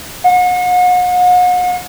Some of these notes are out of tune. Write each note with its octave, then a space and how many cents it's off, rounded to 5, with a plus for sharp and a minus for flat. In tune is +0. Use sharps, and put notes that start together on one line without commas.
F#5 -40